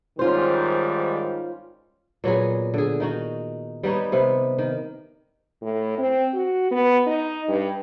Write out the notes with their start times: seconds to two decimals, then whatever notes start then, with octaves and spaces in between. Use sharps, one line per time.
0.19 G#2 D#3 G3 C#4 F4 C5
2.24 A#2 F#3 B3 G#4
2.74 D3 G#4
3.00 D#3 D#4 F#4
3.83 G3 B3 D#4 C#5
4.12 C3 B3
4.58 D#3
5.62 A2
5.98 C4
6.34 F#4
6.71 B3
7.06 D#4
7.48 G2